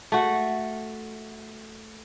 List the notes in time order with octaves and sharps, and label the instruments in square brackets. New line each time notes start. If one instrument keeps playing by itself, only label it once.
[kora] A3 F#4